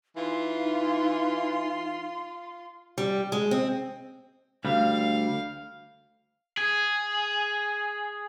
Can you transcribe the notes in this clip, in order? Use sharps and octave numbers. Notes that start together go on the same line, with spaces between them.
E3 D#4 F4 C6
G3
G#3
C4
D2 G3 F5
G#4 G#6